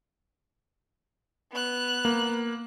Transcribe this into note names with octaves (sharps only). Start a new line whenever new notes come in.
B3 F#6
A#3